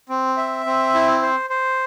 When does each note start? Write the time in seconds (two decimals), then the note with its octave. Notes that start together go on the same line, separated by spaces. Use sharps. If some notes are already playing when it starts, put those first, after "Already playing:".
0.09 C4
0.37 E5
0.66 C4
0.94 E4
1.22 C5
1.50 C5